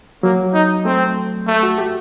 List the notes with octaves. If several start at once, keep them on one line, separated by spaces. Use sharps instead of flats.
F#3 A#3
D#4
A3 C4
A3
F#4
G4